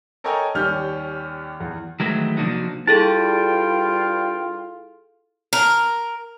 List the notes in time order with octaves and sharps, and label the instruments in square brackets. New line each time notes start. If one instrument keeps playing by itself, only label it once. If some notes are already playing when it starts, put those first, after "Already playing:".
[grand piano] A4 A#4 C#5 D#5 G5 G#5
D#2 G3 C#4 F6 G6
E2
[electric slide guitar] D#3 E3 F#3 G#3 A3
C3 F3 A#3 D4 D#4 F#4
[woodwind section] G2 G3 G5 [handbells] E4 G#4 A4 [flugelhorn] F4 [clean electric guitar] A5
[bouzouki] A#4